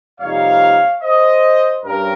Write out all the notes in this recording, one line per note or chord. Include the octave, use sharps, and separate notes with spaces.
F2 C3 G3 A#3 D#4 C#5 F5
C5 D#5
G2 G3 C#4 A#4